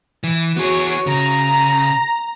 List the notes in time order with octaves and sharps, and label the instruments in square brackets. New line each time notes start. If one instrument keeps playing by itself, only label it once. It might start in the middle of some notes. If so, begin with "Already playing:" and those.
[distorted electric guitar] E3
[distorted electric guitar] B3 G#4 [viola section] F#4 C#5
[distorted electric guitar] C#3 [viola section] A#5